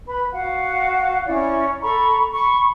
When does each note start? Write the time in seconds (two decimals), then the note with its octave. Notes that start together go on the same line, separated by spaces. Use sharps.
0.06 B4 B5
0.31 F#4 F5 F#5
1.26 C#4 E4 D5
1.81 A4 A#5 B5 C#6
2.33 B5 C#6